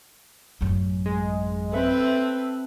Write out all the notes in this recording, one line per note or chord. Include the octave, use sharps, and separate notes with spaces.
A1 F#2
G#3
C4 A4 B4 E5